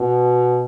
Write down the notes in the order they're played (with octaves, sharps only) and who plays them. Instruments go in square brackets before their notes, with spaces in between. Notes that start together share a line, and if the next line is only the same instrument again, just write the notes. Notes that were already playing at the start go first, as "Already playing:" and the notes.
Already playing: [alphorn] B2